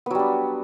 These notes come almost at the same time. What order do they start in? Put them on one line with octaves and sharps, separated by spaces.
B3 F#3 G3 D4